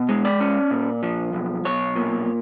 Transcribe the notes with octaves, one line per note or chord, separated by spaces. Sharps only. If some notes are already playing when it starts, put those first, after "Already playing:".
Already playing: B2
G#3
D5
C#4
A#2
F3
B1
B1 C#5
A#2